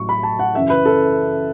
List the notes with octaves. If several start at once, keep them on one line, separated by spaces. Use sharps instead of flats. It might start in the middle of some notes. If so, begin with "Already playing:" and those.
Already playing: A1 A2 F#3 C#6
B5
A5
F#5
F#2 C#3 E3 E5
B4
A4